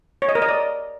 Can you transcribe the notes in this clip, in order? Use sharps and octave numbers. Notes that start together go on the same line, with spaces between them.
C#5
D#5
A#4
D#5
D5